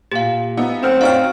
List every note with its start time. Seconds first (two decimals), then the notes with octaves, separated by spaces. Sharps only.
0.12 A#2 G4 F5
0.57 B3 D#4 E5
0.83 F#2 A3 C4 F#5 F6 E7
1.01 C#4 D#4 F#4 D5 F5 G5 C#6 F6